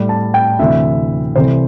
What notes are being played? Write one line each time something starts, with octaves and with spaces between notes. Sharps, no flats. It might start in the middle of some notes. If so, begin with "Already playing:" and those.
Already playing: A2 G3
A5
G5
D2 C3 E3 E5
C2 C3 E3 A3 C5